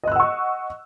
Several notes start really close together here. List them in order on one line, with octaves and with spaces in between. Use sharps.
D#5 F#6 E6 F#5 C#6